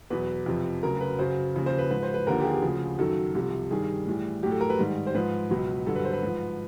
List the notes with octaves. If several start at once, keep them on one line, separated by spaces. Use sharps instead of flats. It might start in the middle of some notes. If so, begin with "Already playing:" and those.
E2 B2 F#3 B4
F2 C3 F3
D2 C#3 F#3 A#4
B4
F#2 C#3 F#3 C5
D#2 C#3 F3
C5
B4
G#2 F3 B4
C5
B4
D#2 D3 F3 A#4
G4
G#4
D2 C#3 F3
F#2 D#3 F#3 A4
C2 C3 F3
G2 D#3 G3 G#4
A2 E3 G3
A2 F#3 G4
A4
A#4
B4
G#2 D#3 G3
C5
G#2 F3 B4
C#2 B2 F#3
G2 D3 F#3 A4
B4
C5
B4
G#2 F3